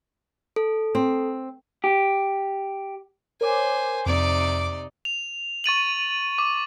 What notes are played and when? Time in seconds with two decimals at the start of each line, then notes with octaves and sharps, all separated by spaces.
0.56 A4
0.95 C4
1.84 G4
3.41 A#4 C5 C#5 G#5 D6
4.06 F2 C3 D#4 D5 D6
5.05 F7
5.64 C#6 A6 D#7 F#7
6.38 D6